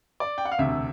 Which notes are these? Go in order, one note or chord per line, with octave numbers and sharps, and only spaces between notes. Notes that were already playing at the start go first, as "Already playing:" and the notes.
D5
G5
F#5
F5
E1 D2 C3 E5